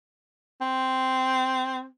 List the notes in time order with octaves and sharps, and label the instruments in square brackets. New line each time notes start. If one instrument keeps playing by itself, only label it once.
[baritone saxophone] C4